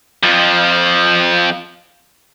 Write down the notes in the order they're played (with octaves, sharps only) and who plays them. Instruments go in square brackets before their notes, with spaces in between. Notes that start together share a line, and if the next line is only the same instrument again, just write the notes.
[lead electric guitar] F2 F3